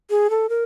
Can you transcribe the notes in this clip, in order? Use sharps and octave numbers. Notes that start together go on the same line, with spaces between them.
G#4
A4
A#4